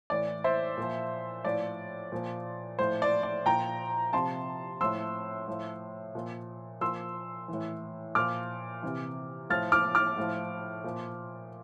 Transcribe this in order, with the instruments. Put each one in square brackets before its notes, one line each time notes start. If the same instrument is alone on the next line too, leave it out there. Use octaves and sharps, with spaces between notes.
[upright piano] A2 E3 D5
C5 E5
A#2 F3
A2 F3 D5
A#2 F3
A2 F3 C5
D5
D5
A#2 F3 G5 A#5
C3 F3 A5 C6
A2 F3 C6 E6
A2 F3
A#2 F3
A#2 F3 C6 E6
E3
A2
A#2 F3 D6 F6
C3 E3
A2 F3 F6 A6
D6 F6
D6 F6
A2 F3
A#2 F3